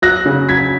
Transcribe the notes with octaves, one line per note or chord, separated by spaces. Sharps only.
F#3 F#6 A#6
C#3
F#3 G#6 B6